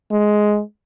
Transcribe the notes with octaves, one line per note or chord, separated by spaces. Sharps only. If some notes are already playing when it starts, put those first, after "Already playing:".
G#3